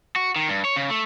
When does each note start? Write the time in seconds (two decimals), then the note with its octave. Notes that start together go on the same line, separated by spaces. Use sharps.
0.16 F#4
0.36 D#3
0.49 G2
0.65 C#5
0.76 C#3
0.90 A3